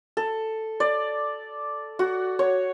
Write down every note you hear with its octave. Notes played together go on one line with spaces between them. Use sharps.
A4
D5
F#4
C#5